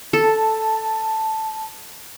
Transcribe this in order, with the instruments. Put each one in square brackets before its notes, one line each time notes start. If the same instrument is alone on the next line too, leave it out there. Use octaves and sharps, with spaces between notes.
[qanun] A4 [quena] A5